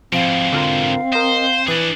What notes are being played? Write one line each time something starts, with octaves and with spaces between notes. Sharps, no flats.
G#2 B2 F3 C4 F5
D3 F4 A#4
A#4 C5 D#5
E3 D4 G#4 B4 D6